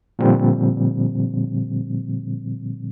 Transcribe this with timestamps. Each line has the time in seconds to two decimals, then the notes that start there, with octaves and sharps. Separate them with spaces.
0.19 A#2 D3 F3 G3 C4